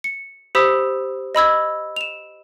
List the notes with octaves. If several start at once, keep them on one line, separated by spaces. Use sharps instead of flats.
C#7
G4 C5 B5 D#6 E6 B6
D#5 B5 E6 G#6
E7 F7